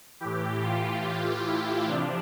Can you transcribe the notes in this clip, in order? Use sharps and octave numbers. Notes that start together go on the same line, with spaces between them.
A2 E3 G4
F4
F4
E4
C3 F3 D4